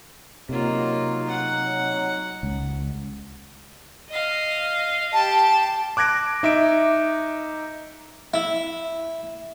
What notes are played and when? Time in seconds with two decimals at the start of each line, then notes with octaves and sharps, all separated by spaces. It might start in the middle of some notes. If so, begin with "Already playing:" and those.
0.49 C3 F#3 A#3 D#4 F4
1.28 F#5
2.43 C#2
4.09 D#5 F5
5.13 G4 A5
5.97 D6 F#6 G#6 A#6 D7
6.43 D#4 E5 D6 D7
8.34 E4